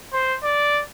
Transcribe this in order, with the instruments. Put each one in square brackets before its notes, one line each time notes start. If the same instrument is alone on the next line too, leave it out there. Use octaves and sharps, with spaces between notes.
[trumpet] C5
D5